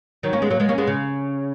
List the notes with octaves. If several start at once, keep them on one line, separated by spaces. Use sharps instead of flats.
D#3 F#3
A#3 C#4
G#3 B3
F#3 A#3
G#3 B3
A#3 C#4
G#3 B3
C#3